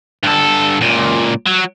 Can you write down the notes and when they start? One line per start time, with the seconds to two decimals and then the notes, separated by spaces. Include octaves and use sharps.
0.23 G2 A4
0.81 C#2 A#2
1.47 F#3